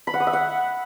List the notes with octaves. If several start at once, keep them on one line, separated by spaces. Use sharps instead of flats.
B5
F#5
D#6
E5
F#5